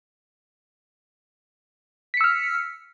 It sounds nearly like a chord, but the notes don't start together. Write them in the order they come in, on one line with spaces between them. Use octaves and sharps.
B6 C#7 E6 F6